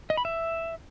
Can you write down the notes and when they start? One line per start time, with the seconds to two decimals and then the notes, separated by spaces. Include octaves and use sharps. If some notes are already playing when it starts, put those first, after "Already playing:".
0.10 D#5
0.17 B5
0.25 E5